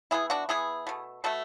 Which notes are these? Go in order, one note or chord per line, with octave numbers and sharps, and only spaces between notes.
E3 B3 E4 G#4
D4 F#4
E3 B3 E4 G#4
B2 A3
B2 A3 F#4 A4